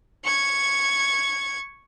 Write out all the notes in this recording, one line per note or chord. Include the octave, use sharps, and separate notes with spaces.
C#6 G#6